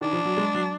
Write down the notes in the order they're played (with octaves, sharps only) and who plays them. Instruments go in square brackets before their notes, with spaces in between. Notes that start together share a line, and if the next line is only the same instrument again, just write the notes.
[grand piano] D#3 [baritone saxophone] D4
[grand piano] F3
F#3
G#3
F#3